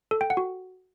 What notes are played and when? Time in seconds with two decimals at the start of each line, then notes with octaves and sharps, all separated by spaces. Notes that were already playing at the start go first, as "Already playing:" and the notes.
0.11 A4
0.21 G5
0.30 F#5
0.37 F#4